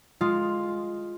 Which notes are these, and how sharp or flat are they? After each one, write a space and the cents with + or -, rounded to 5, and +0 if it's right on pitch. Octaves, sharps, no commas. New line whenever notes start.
G#3 +0 F4 +5 D#5 +0